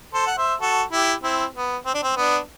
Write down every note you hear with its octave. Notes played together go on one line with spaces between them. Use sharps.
A4 C5
F#5
C5 E5
F#4 A4
E4 G4
C4 E4
B3
C4
D4
C4
B3 D4